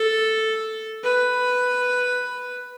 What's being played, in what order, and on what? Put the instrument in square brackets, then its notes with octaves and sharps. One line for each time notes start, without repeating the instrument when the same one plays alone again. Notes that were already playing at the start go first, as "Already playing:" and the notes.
Already playing: [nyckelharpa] A4
B4